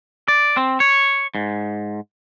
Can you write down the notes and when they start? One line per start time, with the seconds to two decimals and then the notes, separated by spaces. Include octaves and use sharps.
0.28 D5
0.57 C4
0.80 C#5
1.35 G#2